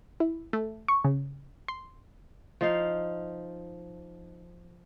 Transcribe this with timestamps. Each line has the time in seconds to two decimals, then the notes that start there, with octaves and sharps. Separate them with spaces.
0.20 E4
0.53 A3
0.88 C#6
1.04 C#3
1.68 C6
2.61 F3 D#4 F5